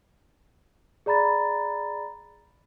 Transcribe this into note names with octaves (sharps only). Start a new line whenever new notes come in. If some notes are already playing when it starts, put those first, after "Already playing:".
G#4 D5 A#5 B5 A6